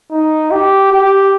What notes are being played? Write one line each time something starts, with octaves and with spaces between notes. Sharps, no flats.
D#4
G4
G4